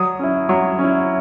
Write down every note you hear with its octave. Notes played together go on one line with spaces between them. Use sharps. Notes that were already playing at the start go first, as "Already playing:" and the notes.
Already playing: F#3 D#6
C#4 E4
F#3
C#4
E4